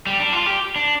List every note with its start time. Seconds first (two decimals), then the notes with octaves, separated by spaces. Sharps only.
0.07 G3
0.20 D4
0.33 F4
0.46 G4
0.76 D4